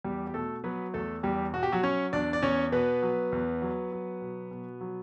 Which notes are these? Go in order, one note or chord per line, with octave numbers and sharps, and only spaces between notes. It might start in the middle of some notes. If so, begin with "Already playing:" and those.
E2 G3 G4
G4
B2 A3 A4
F#3 B3 B4
E2 A3 A4
E2 G3 G4
B2 F#4
G4
F#3 F#4
F#3 C#4 C#5
E2 D4 D5
D5
E2 C#4 C#5
B2 B3 B4
F#3
E2
F#3
F#3
B2
B2
F#3